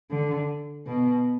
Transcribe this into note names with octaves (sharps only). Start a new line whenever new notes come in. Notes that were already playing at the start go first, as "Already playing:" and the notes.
D3
B2